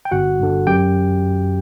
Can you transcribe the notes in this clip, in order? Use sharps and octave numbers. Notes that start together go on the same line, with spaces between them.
G5
G1 F#4 F#5
G2 D3
F#2 G4 G5